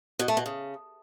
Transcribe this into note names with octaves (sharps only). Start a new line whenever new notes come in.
B2
A3
B2
C#3